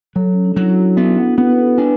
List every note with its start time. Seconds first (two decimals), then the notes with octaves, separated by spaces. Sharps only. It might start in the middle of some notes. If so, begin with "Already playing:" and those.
0.16 F#3 A4
0.33 C#4
0.45 D4
0.56 F#3 E4
0.70 F#4
0.97 B3 E4
1.18 D4
1.38 B3 B4
1.51 B4
1.59 A4
1.78 D4 B4